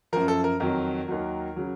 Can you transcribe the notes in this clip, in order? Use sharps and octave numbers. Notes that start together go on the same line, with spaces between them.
F#2 F3 A#4
A4
A#4
F2 D#3 F#3 A#4
D#2 D#3 F#3
C#3 F#3